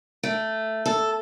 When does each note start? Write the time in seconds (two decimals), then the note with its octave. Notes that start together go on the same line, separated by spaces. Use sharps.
0.23 A3
0.86 A4